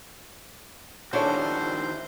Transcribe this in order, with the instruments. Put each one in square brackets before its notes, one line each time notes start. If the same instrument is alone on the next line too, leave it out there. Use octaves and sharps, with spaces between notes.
[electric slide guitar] D#3 E4 F#4 [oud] D4 [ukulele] G#4 A4 C#5 [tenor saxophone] C5